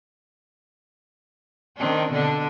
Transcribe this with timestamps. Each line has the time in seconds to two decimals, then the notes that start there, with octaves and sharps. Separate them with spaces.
1.77 D#3 C4 D4
2.12 B2 D3 D4